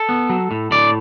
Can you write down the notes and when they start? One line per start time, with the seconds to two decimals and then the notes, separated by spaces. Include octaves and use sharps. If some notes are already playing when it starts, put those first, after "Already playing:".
Already playing: A4
0.09 B3
0.30 F#3
0.51 A2
0.71 A2 D5